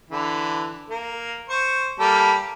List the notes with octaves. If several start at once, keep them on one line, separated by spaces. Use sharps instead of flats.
D3 E3
A#3
C5 C#6
G3 A#3 A4